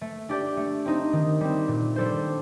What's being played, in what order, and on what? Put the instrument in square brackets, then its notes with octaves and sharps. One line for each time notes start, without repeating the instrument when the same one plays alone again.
[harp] A3
D4 G4 D5
A3
C4 D#4
D#3
G3 C4
A#2
G3 D4 A4 C5